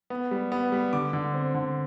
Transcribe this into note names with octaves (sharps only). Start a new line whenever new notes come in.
B3
G3
B3
G3
D3 D6
D3
C4
D3